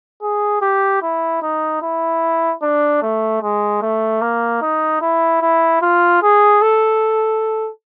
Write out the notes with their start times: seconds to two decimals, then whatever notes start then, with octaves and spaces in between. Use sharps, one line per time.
0.22 G#4
0.62 G4
1.02 E4
1.42 D#4
1.82 E4
2.62 D4
3.02 A3
3.42 G#3
3.82 A3
4.21 A#3
4.62 D#4
5.01 E4
5.42 E4
5.82 F4
6.22 G#4
6.62 A4